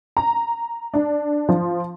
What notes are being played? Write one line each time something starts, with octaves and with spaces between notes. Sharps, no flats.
A#5
D4
F3